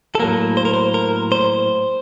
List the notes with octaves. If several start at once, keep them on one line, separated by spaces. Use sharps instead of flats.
A4
A2 F#3 A#3 A#4
C5
A#4
C5
A#4
C5